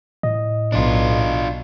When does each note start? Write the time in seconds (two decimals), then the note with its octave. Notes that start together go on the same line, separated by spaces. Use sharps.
0.23 A2 D#5
0.72 B1 D4 F4